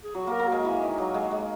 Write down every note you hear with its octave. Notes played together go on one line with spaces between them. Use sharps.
G#4
F#3 F#4
A#3 A#4
A#3
G#3 F#4
E3
D#3
F#3
G#3
G#3